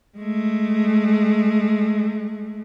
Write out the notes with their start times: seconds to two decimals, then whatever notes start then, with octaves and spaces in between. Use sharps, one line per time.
0.17 G#3 A3